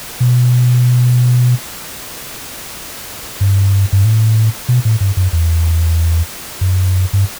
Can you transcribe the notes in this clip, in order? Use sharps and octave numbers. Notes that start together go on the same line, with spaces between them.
B2
G2
G2
A2
B2
A2
G2
F#2
E2
F#2
G2